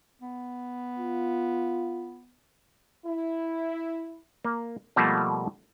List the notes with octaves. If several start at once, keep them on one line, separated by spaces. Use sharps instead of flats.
B3
F4
E4
A#3
B2 F3 G3 A3 A#3